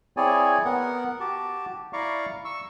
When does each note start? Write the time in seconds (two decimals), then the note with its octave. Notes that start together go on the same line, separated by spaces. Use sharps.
0.17 C4 E4 G#4 C#5 D5 G#5
0.65 B3 A#4 F#5
1.20 F#4 G4 A5 D6
1.93 E4 D5 F5 A#5 C#6 D6
2.45 C#6 E6